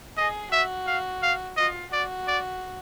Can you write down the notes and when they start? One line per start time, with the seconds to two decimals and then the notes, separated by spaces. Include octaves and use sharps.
0.17 G#4 D#5
0.52 F#4 E5
0.87 F5
1.22 F5
1.57 F4 D#5
1.92 F#4 D5
2.27 D5